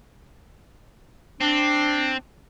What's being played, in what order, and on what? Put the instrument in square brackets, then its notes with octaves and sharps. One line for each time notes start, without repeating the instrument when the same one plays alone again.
[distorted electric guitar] C4 [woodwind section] D4